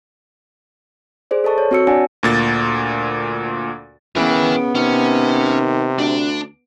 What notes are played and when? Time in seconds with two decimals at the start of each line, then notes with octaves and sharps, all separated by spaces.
1.31 G#4 C5 D5
1.44 A4 D#5 A5 C#6
1.58 C#5
1.71 C4 F#4 C#5 E6 C#7
1.87 D4 D5 F#5 G#5 A5 A#6
2.23 D2 A#2 A6
4.16 C#3 E3 B3 A#4 G5
4.75 C3 D#3 C#4
5.99 D2 D4